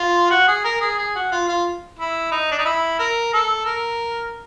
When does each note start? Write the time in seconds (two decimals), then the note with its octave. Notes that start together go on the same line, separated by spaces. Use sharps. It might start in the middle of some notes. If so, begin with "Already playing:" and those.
Already playing: F4
0.30 F#4
0.47 G#4
0.64 A#4
0.81 G#4
0.98 G#4
1.15 F#4
1.31 F4
1.48 F4
1.99 E4
2.31 D#4
2.51 D4
2.58 D#4
2.65 E4
2.99 A#4
3.33 A4
3.66 A#4